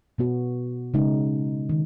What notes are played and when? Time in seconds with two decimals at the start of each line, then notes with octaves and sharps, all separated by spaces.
0.18 B2 B3 F#4
0.94 C#3 G#3 D#4
1.69 D#3